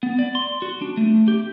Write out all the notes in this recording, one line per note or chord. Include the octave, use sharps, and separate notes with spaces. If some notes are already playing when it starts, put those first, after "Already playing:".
B3
D5
C6
F#4
D4
A3
G4